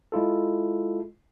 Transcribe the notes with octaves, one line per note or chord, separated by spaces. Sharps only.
G#3 E4 F4 A4